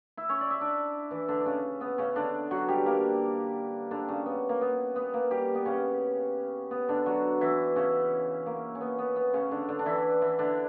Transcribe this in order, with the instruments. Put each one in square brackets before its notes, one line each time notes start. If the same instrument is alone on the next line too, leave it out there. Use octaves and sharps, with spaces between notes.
[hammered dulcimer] E4 E5
C#4 C#5
D5
E5
D4 D5
E3 E4
D3 D4
D4
C#3 C#4
B3
C#3 C#4
D3 D4
F#3 F#4
G3 G4
A#3 A#4
D3 D4
C#3 C#4
B3
A#3
B3
B3
A#3
G3 G4
B3
C#3 C#4
B3
D3 D4
F#3 F#4
E3 E4
C#3 C#4
A#3
C#4
B3
B3
B3
C#3 C#4
D3 D4
D3 D4
D4
E3 E4
E3 E4
D3 D4